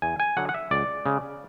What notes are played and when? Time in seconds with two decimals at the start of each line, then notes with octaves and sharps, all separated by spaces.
0.02 E2 G#5
0.20 G#5
0.37 D3 F#3 F#5
0.49 F#5
0.55 E5
0.71 C#2 D5
1.06 C#3 G#3